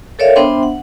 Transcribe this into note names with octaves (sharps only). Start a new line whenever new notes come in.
A4 A#4 C#5 D5 E5 F5
B3 D4 C5 E5 G5 C6
F#5